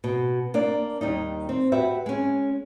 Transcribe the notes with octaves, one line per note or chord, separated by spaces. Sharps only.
B2
A#3 D4 D5
D#2 G3 D#4
C4
F#4 G4 B4 E5
G#3 C#4